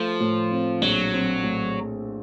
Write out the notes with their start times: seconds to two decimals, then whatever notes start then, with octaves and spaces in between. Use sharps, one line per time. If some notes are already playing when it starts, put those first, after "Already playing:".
Already playing: F3 A3
0.20 A2
0.51 C4
0.82 A#1 F#3
1.13 C4
1.43 A2